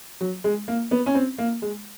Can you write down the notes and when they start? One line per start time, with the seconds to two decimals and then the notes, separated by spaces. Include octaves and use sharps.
0.21 F#3
0.44 G#3
0.68 A#3
0.91 B3
1.06 C#4
1.15 C4
1.38 A#3
1.62 G#3